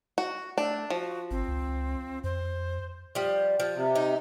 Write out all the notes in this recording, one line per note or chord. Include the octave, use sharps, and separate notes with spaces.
F#4
A3 D4
F3 F#4
G#1 C4
C#2
F2 C5
F3 G3
F3
C3
D#4